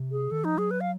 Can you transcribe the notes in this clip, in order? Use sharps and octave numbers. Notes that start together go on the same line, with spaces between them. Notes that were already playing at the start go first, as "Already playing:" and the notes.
Already playing: C3
G#4
D#3 A4
F3 D#4
F#3 G#4
B4
F5